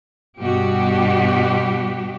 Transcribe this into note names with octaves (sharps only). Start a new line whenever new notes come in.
G2 B2 F#4 G4